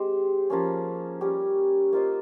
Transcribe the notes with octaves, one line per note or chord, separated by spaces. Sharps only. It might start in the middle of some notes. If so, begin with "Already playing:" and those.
Already playing: G#3 C4 G4 C5
F3 A#3 C#4 G#4
G3 C#4 G4
A#3 F4 C5 D#5